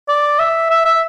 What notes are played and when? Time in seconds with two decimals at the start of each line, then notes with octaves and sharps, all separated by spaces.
0.08 D5
0.39 E5
0.70 E5
0.85 E5